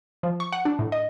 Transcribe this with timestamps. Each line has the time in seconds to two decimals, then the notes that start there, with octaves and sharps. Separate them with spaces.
0.23 F3
0.40 C#6
0.53 F#5
0.65 D4
0.79 A2
0.92 D#5